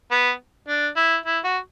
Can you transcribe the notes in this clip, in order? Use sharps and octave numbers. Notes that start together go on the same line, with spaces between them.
B3
D4
E4
E4
F#4